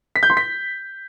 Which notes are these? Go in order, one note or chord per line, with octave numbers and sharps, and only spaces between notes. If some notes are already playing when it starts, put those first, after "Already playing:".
B6
G6
C6
B6